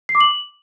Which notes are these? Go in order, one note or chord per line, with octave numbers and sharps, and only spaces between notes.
C7
D6
F#7